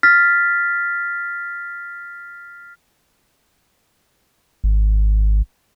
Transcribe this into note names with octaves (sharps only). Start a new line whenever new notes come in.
F6 A6 B6
G#1